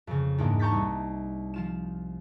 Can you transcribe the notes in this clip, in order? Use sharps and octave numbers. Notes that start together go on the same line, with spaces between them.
F2 C#3
E2 G#2 A#3 D4
A5 A#5 C#6 G6 A6 B6
C2 D#4
F3 F4 E7